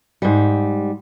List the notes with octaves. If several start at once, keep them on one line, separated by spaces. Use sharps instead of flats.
G#2 G3